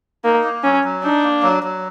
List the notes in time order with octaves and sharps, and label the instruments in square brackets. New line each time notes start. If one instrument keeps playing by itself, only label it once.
[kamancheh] A#3 [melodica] D#4
[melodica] A#3
[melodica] F#3 [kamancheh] C#4
[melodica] F#3
[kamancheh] D4 [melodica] D#4
[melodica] A#3
F#3
F#3